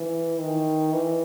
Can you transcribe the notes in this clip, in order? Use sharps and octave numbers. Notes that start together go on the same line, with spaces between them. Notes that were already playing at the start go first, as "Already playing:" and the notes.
Already playing: E3
D#3
E3